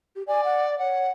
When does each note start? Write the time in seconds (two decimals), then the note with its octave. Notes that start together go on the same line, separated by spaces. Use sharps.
0.16 G4
0.27 D5 G#5
0.44 F#5
0.79 C#5 F#5